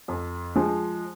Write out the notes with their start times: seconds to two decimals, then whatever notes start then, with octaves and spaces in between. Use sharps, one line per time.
0.08 F2
0.56 F3 G#3